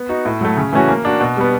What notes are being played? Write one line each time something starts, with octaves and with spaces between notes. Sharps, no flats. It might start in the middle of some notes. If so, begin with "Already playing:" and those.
Already playing: B3
D#4 F#4
A2
F#3 A3
C#3
E3 A3 C#4 F#4
A#3
D4 F#4
B2
G3 B3